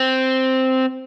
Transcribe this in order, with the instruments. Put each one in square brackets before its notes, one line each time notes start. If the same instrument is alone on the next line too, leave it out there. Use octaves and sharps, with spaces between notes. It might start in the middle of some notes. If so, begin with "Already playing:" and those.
Already playing: [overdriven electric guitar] C4